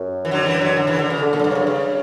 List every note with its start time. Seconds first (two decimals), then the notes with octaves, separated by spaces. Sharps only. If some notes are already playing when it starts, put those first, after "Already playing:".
Already playing: F#2
0.25 E3
0.31 D3 F#3
0.46 E3 G3
0.61 D3 F#3
0.76 D3
0.87 C#3 E3
0.99 D3
1.10 C#3
1.22 D3
1.33 A#2
1.36 F#2 D3
1.44 G2
1.51 F#2 C#3
1.67 G2 C#3